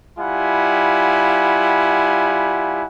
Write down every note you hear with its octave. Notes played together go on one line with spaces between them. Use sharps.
G3 E4 F4 F#5 G#5